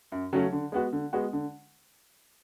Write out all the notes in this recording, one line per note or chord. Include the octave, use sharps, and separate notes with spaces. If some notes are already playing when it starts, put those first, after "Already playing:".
F#2
C#3 F#3 A3 C#4
D3
G#3 B3 F#4
D3
G#3 B3 F#4
D3